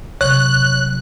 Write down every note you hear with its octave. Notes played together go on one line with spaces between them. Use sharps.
C3 F#3 C#5 F#6